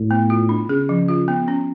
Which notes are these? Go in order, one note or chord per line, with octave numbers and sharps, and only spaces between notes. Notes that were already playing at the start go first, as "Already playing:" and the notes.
Already playing: A2
B3
F4
D4
C#3 G#4
F3
F4
B3
C#4